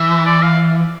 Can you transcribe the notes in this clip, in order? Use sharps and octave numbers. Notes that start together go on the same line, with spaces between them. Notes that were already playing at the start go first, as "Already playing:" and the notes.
Already playing: E3 E5
D5
F5